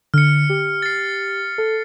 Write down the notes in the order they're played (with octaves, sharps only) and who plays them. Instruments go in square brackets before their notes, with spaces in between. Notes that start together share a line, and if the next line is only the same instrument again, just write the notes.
[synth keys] D3 [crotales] F6 C#7
[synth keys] G4
[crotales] A6 C7
[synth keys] A4